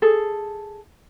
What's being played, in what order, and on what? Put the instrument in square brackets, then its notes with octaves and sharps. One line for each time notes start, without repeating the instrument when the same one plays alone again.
[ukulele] G#4 A4